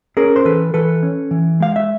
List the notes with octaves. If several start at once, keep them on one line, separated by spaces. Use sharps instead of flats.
C#4 G#4 A#4
C5
E3 A4 B4
E3 A4 B4
C#4
E3
G#3 F5
E5